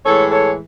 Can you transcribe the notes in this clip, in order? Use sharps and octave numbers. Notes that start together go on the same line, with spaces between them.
A2 E3 G#3 A4 C#5
A4 C#5